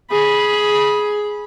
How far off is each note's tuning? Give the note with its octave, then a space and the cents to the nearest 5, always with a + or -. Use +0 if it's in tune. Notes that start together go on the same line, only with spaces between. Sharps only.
G#4 +5 B5 -15